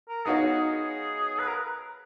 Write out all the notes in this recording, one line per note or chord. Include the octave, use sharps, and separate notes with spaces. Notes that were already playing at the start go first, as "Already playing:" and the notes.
A#4
B3 D#4 F#4 G#4 C#5 F5
G#4
B4
A#4